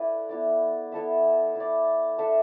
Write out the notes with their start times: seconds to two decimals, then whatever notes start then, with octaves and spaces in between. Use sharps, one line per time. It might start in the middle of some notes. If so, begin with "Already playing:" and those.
Already playing: D4 E4 A4 B4 D5 E5
0.29 B3 E4 D5
0.92 B3 E4 A4 E5
1.55 E4 D5
2.18 D4 A4 E5